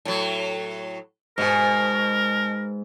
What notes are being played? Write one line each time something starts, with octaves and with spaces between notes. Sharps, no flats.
A2 F#3
G#2 B2 A#4 G#5